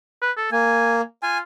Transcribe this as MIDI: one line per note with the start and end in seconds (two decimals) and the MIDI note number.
0.22 0.31 71
0.37 0.47 69
0.52 1.01 58
0.52 1.01 80
1.23 1.41 65
1.23 1.38 80